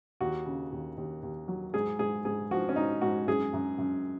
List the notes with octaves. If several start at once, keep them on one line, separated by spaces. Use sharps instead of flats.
D#2 F#4
C#3
D#2
D#2
D#2
F#3
G#2 G#4
G#2 G#4
G#2 G#4
F3 F#4
C#4
G#2 D#4
G#2 F#4
F#2 G#4
F#2
F#2